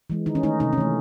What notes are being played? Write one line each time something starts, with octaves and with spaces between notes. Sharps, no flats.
E3 G#3
D#3 D#4
C#4
A3 D#4
C3 D#4
C#4
E3 A3